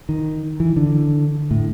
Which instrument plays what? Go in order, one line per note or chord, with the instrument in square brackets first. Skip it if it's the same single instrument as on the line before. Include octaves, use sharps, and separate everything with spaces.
[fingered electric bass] D#3
E3
D3
A2